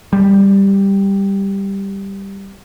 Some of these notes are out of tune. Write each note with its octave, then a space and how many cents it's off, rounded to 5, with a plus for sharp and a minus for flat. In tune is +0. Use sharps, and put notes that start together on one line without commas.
G3 +5